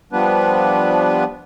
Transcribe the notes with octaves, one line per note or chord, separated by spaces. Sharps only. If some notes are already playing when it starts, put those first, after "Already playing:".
F3 G3 B3 D4 B4